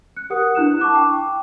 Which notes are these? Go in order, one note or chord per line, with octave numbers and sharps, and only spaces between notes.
F#6 C#7
G4 A#4 B4 F#5 D#6 C#7
D4 E4 F#6 E7
A5 C#6 D6 F#6
G5